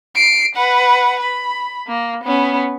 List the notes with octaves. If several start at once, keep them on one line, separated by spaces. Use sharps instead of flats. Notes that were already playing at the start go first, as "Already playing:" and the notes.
C7 D7
B4 F#5
B5
A#3
B3 C#4